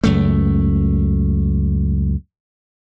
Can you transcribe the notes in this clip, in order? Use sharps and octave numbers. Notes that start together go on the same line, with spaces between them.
C#2 F#2 A3